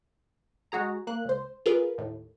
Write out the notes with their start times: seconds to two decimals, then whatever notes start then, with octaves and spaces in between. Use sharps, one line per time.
0.72 G#3 F#4 G#4 A#5
1.07 A#3 F#6
1.25 C#2 C5
1.66 F4 G#4 A#4 B4
1.98 D#2 A2